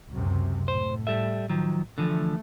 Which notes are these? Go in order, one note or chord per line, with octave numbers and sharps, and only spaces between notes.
C#2 F#2 C3
A2 C5
G3 A4 E5
D#3 F3 F#3
D3 E3 F3 A3